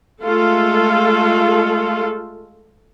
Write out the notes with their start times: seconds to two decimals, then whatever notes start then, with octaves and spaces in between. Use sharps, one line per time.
0.21 G#3 A3 F4 A4